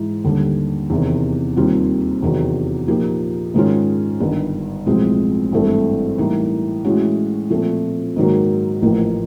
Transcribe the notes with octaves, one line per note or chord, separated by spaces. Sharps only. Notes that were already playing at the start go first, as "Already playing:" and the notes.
Already playing: G#2 E3 G#3
D#2 D3 G3
E2 C3 D#3
D#2 D#3 G3 C4 F4
E2 C3 D#3 F#3
A#2 F3 A#3 D#4 G4
G#2 D#3 G#3 C#4 F4
G1 G2 D#3
B1 A2 F3 G#3 C4
G#1 G2 E3 A3 C4
A2 E3 G3 A#3 D#4
A2 E3 G#3 C#4 F#4
A#2 F3 A3 C4
G#2 D#3 F#3 A#3
A1 A2 F3 A#3